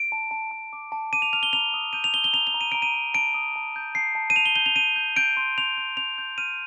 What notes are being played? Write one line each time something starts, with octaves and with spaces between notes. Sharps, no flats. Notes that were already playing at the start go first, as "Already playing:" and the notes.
Already playing: D7
A5
A5
A5
D6
A5
D6 D#7
F7
F6 F7
G7
A#5 F7
D#6
G6 D#7
F7
D#6 G7
G7
A#5 F7
F7
A#5
D#7
A#5 D7
D#7
A#5
A5 D7
D#6
A5
G6
A5 C7
A5
D#7
A5 F7
G7
G6 G7
F7
G6 D#7
G6
G6 D7
C6
C6 F7
G6
C6 F7
G6
F6 D#7